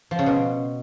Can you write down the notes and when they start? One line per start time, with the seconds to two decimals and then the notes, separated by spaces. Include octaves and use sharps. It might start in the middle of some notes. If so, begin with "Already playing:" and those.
0.11 F3
0.19 C#3
0.26 B2